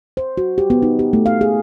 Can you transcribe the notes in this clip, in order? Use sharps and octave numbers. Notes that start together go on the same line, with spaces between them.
C5
F#4
G4
B3
D#4
G4
A3
F5
G#4